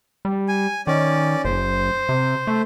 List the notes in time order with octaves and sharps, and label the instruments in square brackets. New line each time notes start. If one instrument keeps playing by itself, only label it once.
[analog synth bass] G3
[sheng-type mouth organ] G#5
[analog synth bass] D#3 [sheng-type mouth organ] C#4 D5
[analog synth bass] F#1 [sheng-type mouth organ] C5
[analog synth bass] C3
A3